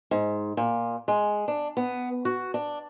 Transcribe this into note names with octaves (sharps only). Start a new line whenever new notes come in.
G#2
A#2
G#3
D4
B3
F#4
D4